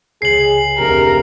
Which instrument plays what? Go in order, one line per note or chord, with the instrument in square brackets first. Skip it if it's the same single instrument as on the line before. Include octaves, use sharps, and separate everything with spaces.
[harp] C#2 C#3 G#6 [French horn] G#4 [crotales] C7 F#7
[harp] F1 D2 C3 [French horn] G4 [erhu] A#4